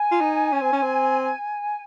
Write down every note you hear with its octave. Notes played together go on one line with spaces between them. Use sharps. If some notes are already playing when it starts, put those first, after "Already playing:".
Already playing: G#5
F4
D#4
C#4
C4
C#4
C4